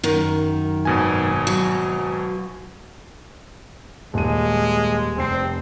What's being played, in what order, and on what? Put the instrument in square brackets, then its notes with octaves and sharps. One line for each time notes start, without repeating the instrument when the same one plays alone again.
[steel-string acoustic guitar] F#2 D#3
[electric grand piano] G#1 B2 G#5
[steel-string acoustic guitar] F#3
[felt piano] D#1 D#7 [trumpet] G#3
[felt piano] F1 C7 [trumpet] C4